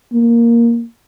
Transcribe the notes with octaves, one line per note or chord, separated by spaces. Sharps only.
A#3